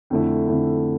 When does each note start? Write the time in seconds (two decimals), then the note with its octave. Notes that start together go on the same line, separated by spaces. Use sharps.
0.10 F2 D3 A3 E4
0.48 F2 D3 A3 E4